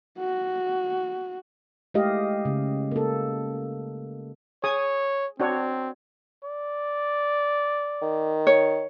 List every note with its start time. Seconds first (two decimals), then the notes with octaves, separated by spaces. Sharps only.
0.19 F#4
1.94 G#3 A3 E4 G4 D#5 F5
2.45 C#3
2.91 A#3 A4
4.64 G#4 C#5 G#5 D#6
5.40 C4 D4 F#4 C#5
6.44 D5
8.02 D#3
8.47 C#5